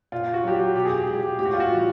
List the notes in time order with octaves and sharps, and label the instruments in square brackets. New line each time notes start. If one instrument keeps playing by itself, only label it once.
[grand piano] A#2 F4
F#4
F#3 G4
F#4
B2 G4
G#4
G4
G#3 G#4
G4
A2 G4
F#4
F4
F#4
E3 G3